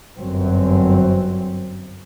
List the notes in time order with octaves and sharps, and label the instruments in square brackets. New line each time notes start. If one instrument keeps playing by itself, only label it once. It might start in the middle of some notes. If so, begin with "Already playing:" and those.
[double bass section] G1 F#2 F#3 C4